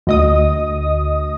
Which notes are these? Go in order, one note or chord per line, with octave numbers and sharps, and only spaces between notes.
D2 D#5 D#6